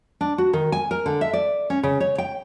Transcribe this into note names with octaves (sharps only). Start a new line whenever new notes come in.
D4
F#4
D#3
G#5
A#4
D3
E5
D5
C#4
C#3
C#5
G5